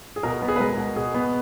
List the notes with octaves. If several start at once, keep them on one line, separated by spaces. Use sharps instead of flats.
G#4
B2 A#4
B3
G#4
B4
G#3 A#4
B2
B2 G#4
B3